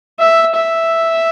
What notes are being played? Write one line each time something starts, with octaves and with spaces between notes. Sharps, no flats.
E5
E5